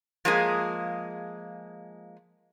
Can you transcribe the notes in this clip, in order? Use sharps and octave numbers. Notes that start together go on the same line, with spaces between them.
F3 G#3 A#3 G#4